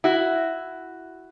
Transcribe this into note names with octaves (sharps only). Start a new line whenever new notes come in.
E4 F#4